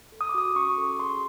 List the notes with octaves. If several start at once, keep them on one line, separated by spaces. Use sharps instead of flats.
A4
D#6
D6
F#4 D#6
C#4 C#6
A4
G#4 C6